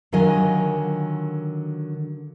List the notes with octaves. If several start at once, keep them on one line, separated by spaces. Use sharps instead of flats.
D3 D#3 F#3 F4 D#5 G#5